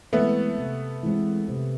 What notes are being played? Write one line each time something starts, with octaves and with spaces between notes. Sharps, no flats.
E3 G#3 A3 B3 C4
C3
E3 G#3 C4
C3